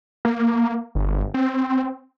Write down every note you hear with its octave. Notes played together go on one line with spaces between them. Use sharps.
A#3
G1
C4